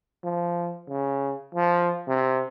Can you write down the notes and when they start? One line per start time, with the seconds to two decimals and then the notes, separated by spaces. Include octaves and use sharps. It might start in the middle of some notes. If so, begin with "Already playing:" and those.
0.24 F3
0.89 C#3
1.55 F3
2.07 C3